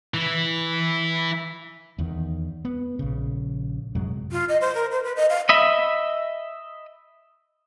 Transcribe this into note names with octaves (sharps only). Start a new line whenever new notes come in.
E3 E4
E2 D#3
B3
A#1 C#3
F#2 C3 F#3 G#3
F4
D#5
C5
A#4
C5
B4
D#5
F5
D#5 E5 B5